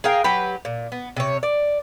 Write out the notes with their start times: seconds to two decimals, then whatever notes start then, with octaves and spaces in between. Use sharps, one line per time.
0.04 G#4 A#4 F5 G5
0.24 F#3 G4 B4
0.65 A#2
0.92 B3
1.16 C3 C#5
1.43 D5